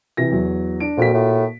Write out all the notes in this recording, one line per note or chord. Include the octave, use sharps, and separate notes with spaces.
C3 E3 A#6
E2 F#3
D4 D7
F2 A#2 F#4 B6
A2